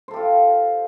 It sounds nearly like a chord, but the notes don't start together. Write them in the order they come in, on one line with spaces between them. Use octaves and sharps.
C5 A4 G4 F4